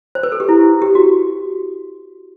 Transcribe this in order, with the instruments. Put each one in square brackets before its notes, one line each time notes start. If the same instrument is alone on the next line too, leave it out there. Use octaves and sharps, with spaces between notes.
[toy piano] C5
B4
A4
G4
E4
G4
F#4